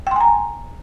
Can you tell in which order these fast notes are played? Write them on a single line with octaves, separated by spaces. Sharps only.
G5 C6 G#5 A#5